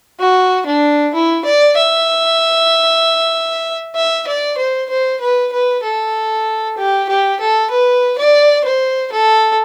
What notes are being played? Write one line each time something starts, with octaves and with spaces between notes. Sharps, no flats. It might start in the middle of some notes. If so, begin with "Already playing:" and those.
F#4
D4
E4
D5
E5
E5
D5
C5
C5
B4
B4
A4
G4
G4
A4
B4
D5
C5
A4